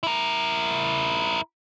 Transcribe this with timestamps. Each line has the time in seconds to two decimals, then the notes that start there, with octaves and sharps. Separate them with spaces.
0.03 E4 A#4